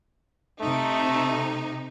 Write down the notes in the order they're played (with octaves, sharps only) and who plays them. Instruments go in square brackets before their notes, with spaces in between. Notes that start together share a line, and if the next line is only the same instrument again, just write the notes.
[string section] C3 D#4 [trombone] A3